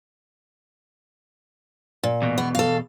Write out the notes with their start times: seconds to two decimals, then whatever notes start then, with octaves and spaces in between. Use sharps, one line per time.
2.03 A#2
2.22 E2 B2
2.38 B3
2.55 A4 F5